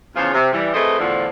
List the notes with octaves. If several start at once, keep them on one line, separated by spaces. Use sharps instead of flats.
E2 C#3 F3 F4
C3
E3 G3
F2 G#3 A3 B4 C5 D#5
E2 A2 D3 F3